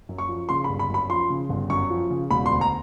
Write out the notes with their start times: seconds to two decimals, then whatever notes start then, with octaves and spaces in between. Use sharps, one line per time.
0.09 F#2
0.18 C#6
0.29 F3
0.49 C#3 C6
0.64 B5
0.70 G1
0.79 B5
0.89 F#2 B5
1.09 F3 C6
1.30 C#3
1.49 G1
1.70 F#2 C#6
1.90 F3
2.10 C#3
2.30 E1 B5
2.46 C6
2.51 D2
2.61 A#5